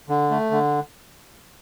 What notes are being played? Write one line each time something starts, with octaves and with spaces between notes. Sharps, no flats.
D3
A3
D3